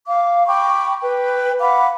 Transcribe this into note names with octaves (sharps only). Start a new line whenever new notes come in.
F5 D6
G5 B5 C#6 D6
B4 G5
F5 F#5 B5 D6